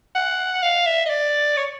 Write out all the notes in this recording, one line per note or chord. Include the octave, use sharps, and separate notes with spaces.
F#5
F5
E5
D#5
D5
C#5